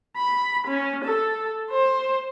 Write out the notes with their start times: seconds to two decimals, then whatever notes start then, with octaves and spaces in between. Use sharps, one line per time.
0.16 B5
0.67 C#4
1.05 A4
1.70 C5